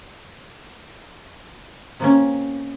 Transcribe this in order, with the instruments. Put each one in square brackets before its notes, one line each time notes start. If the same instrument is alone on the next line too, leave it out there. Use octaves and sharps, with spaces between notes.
[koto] C3 A#3 C#4